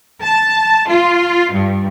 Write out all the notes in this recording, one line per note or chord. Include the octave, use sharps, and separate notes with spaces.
A5
F4
G2